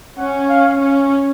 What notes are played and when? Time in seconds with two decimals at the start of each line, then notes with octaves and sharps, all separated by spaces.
0.17 C#4 F#5
0.49 F5
0.79 C#4